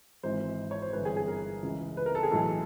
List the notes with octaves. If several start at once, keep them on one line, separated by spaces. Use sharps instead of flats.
G#1 G#2 E3 C5
C#5
C5
G1 G2 E3 B4
G#4
G#4
A#4
C#2 C#3 E3
B4
A#4
A4
G#4
B1 A2 E3 A4